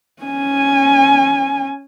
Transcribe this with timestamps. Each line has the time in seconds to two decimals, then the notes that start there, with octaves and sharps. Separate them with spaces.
0.22 C#4 G#5